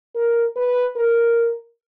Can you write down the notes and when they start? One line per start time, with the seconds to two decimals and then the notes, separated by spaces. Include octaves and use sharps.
0.15 A#4
0.56 B4
0.96 A#4